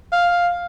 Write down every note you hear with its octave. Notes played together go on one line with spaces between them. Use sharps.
F5